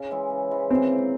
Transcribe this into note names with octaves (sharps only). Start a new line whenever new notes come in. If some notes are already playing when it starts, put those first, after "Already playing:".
Already playing: C#3
E3 G#3 E4
C#3
E3 G#3 E4
E3 C4
A#3 E4